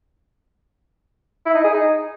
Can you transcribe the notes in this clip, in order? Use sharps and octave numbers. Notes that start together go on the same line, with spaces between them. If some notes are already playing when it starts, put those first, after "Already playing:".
E4
D#4
G#4
D#4